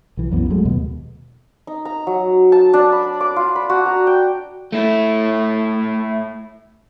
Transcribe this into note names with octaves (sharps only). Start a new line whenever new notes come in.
B1 E3
C2 F#2 E3 B3
F3 F#3 G#3 A3
D#2 B2
D#4
A#5
F#3
A5
D4
B5
D6
F4
B5
F#4
A#5
G5
A3 E4